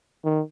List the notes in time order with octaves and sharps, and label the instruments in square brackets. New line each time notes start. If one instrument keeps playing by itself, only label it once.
[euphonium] D#3